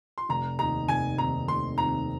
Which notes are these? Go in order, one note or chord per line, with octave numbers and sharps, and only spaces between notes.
C6
F1 A#5
D#2 D#3 C4 D#4 A#5
F1 G#5
D#2 D#3 C4 D#4 A#5
F1 C6
D#2 D#3 C4 D#4 A#5